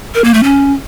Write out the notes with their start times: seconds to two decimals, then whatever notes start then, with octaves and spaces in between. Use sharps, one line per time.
0.15 A#4
0.24 A#3
0.34 A3
0.44 C#4